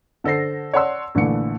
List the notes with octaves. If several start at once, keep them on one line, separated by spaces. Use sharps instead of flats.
D3 A4 C5 A#6 C7
C#5 D5 F#5 A5 C6 E6
A#1 D3 E3 A3 C#7